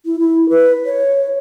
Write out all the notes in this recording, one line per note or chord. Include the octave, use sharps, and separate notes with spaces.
E4
E4
B4
C#5